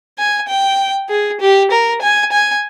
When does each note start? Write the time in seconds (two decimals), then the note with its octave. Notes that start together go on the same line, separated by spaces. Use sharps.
0.18 G#5
0.48 G5
1.09 G#4
1.41 G4
1.71 A#4
2.02 G#5
2.32 G#5